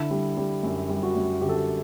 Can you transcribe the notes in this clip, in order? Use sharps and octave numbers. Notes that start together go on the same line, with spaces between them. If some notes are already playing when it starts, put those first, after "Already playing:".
Already playing: D3 E4
G3
G3
F#2
G3
F#4
F#2
D3 G4
A4
G4